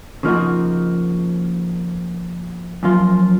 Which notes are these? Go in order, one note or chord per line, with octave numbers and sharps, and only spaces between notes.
C#3 F3 A#3 D#4 F#4
F#2 F3 A#3 F4